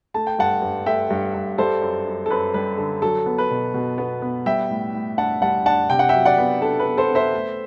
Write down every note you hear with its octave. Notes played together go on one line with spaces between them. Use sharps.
A3 A5
G5
G2 F#5 A5
G2
A3 E5 G5
G2
G2
G3 A4 C5
F#2
F#2
A4
F#2 B4
G3 B4
D3 A4
F#3 A4
B3
B4
B2
B2
B3
B3
G3 E5 G5
A2
A2
D4 F#5 A5
G3 F#5 A5
D4 F#5 A5
C3 G5
F#5
F#3 E5 G5
D5 F#5
B3
D4 A4
B4
B3
A4 C5
B3
C5 E5
A3